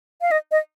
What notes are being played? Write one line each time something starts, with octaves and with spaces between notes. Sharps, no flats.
F5
D#5
D#5